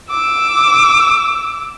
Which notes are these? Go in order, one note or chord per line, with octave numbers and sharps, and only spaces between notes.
D6 E6